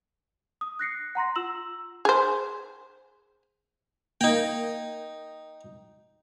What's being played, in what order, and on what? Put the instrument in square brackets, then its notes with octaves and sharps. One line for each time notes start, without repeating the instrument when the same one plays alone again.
[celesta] D#6
F#6 A#6 C7 C#7
F#5 A#5 C6 A#6
F4 E6 E7 F#7
[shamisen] G#4 C5
[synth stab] A#3 [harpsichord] D#4 G5